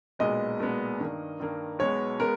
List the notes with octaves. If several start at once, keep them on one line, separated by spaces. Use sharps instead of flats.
B1 A#2 G#3 B3 D#5
B1 A#2 G#3 B3
G2 D#3 A#3
G2 D#3 A#3
B1 B2 G#3 B3 C#5
G#3 B3 A#4